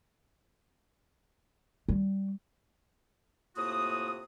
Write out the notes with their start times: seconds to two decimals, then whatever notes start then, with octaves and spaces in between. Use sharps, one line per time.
1.88 G3
3.57 A2 C3 A#3 F4 F#4 D#6